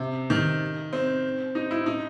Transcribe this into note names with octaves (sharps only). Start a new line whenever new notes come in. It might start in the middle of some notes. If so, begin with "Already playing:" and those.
Already playing: C3
D#3
C4
D#4
E4
D#4